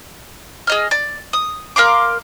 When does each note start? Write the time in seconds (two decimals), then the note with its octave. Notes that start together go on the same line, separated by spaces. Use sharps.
0.67 G#4 D#5 F6
0.91 D5
1.33 D#6
1.76 A#4 F5 C6 D6